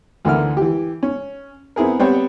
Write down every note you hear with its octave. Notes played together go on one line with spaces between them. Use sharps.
D2 D3 E3 E4 A#4 F6
E3 G4
C#4
B3 C4 E4 G#4 A#4
G3 B3 C4 C5 C#5 G5